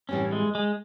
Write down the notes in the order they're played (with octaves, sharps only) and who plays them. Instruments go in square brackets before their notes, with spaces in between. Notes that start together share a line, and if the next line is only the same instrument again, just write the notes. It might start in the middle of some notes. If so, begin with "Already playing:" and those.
[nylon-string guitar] A2 E3 G3 C4 [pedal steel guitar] C#4
[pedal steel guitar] G#3
G#3